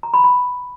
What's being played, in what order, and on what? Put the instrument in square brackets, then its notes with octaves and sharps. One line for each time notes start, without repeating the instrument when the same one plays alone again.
[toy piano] A#5
B5
B5